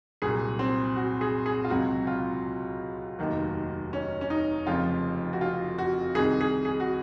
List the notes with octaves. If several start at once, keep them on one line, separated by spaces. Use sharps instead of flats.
C2 A#2 F#3 G#4
C4
F#4
G#4
G#4
F4
C#2 C3 F#3 F#4
F4
F1 D#2 D#3 F#3
C#4
C#4
D#4
F1 F2 C#3 F3 F4
F#4
F4
F#4
C2 C3 D#3 G#4
G#4
G#4
F#4